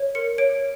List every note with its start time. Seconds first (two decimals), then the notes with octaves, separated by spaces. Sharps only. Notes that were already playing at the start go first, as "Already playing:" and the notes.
Already playing: C#5
0.15 A#4 C#7
0.38 C#5 D7